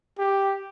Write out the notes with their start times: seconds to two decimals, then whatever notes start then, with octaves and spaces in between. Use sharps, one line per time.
0.18 G4